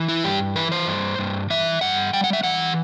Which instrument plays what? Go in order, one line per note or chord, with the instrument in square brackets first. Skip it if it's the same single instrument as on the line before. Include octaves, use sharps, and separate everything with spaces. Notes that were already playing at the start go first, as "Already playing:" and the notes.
Already playing: [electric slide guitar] E3
E4
G2 G4
E3 B4
C5
G2
G2
E3 E5
G2 F#5
G3 G5
F#5
E5
E3 F#5